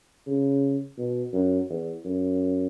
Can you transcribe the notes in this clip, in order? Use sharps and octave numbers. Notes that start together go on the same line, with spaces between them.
C#3
B2
F#2
E2
F#2